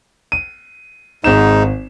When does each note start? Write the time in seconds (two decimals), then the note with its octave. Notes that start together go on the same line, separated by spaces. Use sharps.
0.32 D#7
1.24 G#1 G#2 D#4 E7